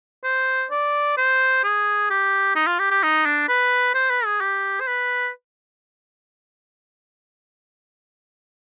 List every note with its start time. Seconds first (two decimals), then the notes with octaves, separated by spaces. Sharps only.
0.24 C5
0.71 D5
1.17 C5
1.64 G#4
2.10 G4
2.55 D#4
2.67 F4
2.79 G4
2.91 G4
3.03 D#4
3.26 D4
3.48 B4
3.94 C5
4.10 B4
4.25 G#4
4.41 G4
4.80 C5
4.87 B4